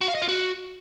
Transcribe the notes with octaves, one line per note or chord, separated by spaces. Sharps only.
F#4
F5
D#5
F4
F#4